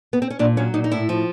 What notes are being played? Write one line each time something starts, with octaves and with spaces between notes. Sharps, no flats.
B3
C4
C#4
A#2 D4
F#3 C#4
A#2 D#4
D#4
A2 E4
F3